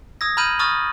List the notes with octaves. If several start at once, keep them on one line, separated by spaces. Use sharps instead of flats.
D#6 E6 G#6 A#6
A#5 B5 F6 G6 D#7 F#7
A#5 C#6 D#6 F6 A6